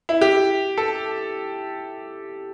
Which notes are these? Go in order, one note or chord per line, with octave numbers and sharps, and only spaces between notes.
E4
G4
A4